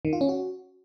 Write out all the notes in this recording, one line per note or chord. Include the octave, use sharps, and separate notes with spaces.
D#3
F4
C#4
F#4